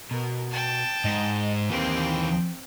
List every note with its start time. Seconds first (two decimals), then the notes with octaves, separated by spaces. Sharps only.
0.11 B2 A#4
0.51 G5 A5
1.05 G#2 D#5
1.70 D#2 E3 A#3 C4 G5